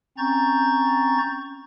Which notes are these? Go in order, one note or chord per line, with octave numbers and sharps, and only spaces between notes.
C4 C#4 A#5 C#6 G6 A6